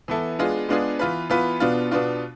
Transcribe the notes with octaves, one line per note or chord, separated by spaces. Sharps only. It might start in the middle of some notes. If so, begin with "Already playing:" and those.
E3 B3 E4 A4
G#3 B3 D4 F4 G#4
G#3 B3 D4 F4 G#4
E3 B3 F4 B4
E3 B3 F4 B4
B2 B3 D4 F4
B2 B3 D4 F4